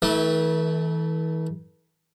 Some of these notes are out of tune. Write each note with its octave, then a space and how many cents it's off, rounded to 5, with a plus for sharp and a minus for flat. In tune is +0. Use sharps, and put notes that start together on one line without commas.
E3 -40 A3 -10